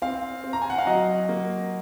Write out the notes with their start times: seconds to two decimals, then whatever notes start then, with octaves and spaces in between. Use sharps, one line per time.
0.02 C4 F5
0.44 C4
0.53 A#5
0.62 G#5
0.70 F#5
0.78 F5
0.87 F#3 D#5
1.29 A#3